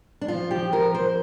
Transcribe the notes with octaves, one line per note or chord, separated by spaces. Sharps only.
D4
F3 F4
F3 G4
F3 A#4
F3 C5